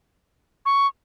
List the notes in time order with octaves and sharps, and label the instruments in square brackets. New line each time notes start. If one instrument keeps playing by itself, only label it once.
[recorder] C#6